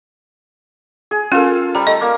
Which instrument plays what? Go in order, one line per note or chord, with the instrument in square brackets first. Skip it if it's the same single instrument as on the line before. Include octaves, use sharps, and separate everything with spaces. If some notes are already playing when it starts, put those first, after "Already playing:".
[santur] G#4
[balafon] C#4 A#4 [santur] F4 A4
[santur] G3 [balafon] A#5
[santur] A3 [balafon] D#5
[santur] A#3